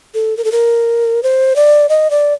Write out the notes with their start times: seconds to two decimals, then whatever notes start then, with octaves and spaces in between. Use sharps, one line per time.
0.14 A4
0.37 A#4
0.44 A4
0.52 A#4
1.23 C5
1.56 D5
1.89 D#5
2.11 D5